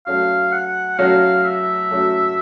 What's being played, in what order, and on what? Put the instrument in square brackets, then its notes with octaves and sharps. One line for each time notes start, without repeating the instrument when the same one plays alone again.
[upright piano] F#3 A3 C#4 F#4 [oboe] F5
[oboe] F#5
[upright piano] F#3 A3 C#4 F#4 [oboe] F5
[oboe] E5
[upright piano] F#3 A3 C#4 F#4